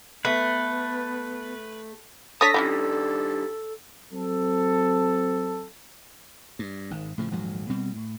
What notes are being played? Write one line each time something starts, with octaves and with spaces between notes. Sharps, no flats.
A3 B3 B4
D4 A4 C#5 A5 D#6 A#6 B6
D#3 G3 C#4 D4 E4 G4
F#3 C4 A4
G2
G#1 G#2
A2 C#3 F3
D#1 G#2 F3 F#3
B2 G3 C4
A2